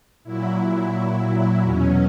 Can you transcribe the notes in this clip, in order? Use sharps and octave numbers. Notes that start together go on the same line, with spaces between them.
A#2 F#3 E4
E2 B2 F#3 C#4